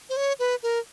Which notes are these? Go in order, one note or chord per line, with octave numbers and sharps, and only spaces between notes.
C5
C#5
B4
A#4